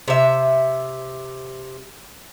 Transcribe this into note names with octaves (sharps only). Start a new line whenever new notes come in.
C3 E5